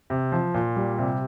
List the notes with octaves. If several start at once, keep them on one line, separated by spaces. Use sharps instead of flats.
C3
F3
A#2
G3
C3